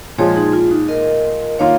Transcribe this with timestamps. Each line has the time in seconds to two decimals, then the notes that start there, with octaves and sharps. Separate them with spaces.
0.18 A#2 F3 G#3 G#4 C#5
0.36 D#4 G#4
0.53 F4
0.71 D#4
0.89 A#4 D#5
1.59 D#3 A#3 F4 C#5 F5